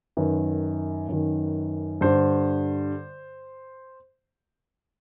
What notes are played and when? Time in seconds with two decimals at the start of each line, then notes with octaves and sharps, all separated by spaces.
0.17 F#2 D#3 B4
1.08 F#2 D#3
2.01 G2 D3 C5